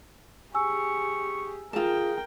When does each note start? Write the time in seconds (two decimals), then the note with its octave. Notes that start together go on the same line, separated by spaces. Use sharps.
0.55 G4 G#4 G#5 C#6 E6
1.73 F4 G#4 A#4 G5 A5